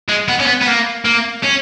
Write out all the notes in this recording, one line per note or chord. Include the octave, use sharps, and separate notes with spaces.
G#3
B3
C#4
B3
B3
A#3
A#3
C#4